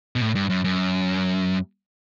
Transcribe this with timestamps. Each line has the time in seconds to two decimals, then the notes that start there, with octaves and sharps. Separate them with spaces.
0.16 B2
0.20 A2
0.35 G2
0.50 F#2
0.64 F#2